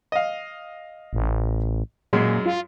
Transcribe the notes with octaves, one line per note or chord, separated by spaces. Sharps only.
D#5 F5
A1
F#2 A#2 G#3
F4